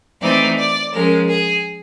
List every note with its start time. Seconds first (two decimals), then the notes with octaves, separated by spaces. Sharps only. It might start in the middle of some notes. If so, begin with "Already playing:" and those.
0.21 E3 A3 C4 D#4 D5
0.58 D5
0.93 F3 G#3 C#4 A#4
1.28 G#4